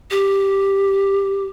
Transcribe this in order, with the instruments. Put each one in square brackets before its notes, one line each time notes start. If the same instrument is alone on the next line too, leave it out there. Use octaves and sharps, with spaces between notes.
[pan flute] G4